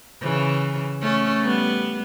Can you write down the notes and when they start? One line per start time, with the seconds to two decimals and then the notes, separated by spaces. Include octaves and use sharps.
0.22 C#3 E3
1.02 A3 C#4
1.43 G3 B3